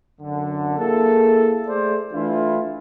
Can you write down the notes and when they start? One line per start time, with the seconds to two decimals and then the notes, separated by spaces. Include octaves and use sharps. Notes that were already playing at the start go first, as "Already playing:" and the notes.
0.21 F#2 D3
0.78 A#3 E4 G#4 A4
1.68 A3 G#4 A4 C5 D5
2.13 E3 A3 D4 E4 F4